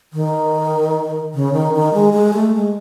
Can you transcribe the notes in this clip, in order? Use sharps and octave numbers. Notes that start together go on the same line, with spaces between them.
D#3
C#3
D#3
D#3
G#3
G#3
A3
G#3